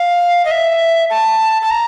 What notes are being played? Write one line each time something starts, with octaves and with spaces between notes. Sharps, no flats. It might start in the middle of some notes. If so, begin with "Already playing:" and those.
Already playing: F5
D#5
E5
A5
A5
A#5